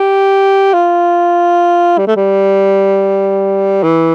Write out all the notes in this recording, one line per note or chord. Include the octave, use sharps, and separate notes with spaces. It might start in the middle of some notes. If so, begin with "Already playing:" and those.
Already playing: G4
F4
G3
A3
G3
E3